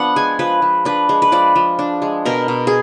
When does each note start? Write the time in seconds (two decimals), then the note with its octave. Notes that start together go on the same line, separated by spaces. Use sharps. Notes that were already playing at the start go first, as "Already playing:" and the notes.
Already playing: F3 B3 D4 F#5
0.16 G#3 G#5
0.39 F3 B4
0.62 F3
0.85 D4 B4
1.09 G#3
1.22 B4
1.32 F3 D5
1.56 F3
1.79 D4
2.02 G#3
2.25 B2 A#4
2.48 B2
2.67 G#4